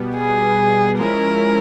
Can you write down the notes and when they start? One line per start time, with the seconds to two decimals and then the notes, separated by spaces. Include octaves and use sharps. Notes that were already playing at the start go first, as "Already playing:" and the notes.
Already playing: B2 G3 B3
0.16 G#4
0.99 F3 G#3 C#4 E4 A#4